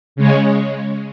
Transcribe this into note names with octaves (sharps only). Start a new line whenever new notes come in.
C#3 G#3 C#4